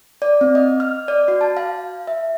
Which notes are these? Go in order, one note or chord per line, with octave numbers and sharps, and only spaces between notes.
D5
C4
D#5
F6
D5
F#4
A5
F5
E5